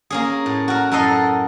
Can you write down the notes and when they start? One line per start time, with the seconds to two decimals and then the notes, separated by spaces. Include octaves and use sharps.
0.10 A#3 C#4 G#4
0.46 A2
0.68 F#4 A#4
0.91 F#2 A2 A4 A#4 D#5 C6